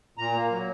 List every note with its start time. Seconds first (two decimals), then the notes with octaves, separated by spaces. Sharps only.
0.17 A#2 A#5
0.34 A#3
0.50 F#3